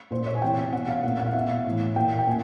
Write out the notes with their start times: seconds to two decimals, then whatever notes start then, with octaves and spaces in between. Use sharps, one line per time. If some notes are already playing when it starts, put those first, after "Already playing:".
0.11 A#2 C5
0.26 C#5
0.35 G#5
0.42 C3 E3 G5
0.73 B2 F#5
0.88 F5
1.03 A#2 F#5
1.20 F#5
1.26 F5
1.33 B2 E5
1.41 F5
1.66 A2 E3
1.96 A#2 G5
2.19 G5
2.27 A#2 G#5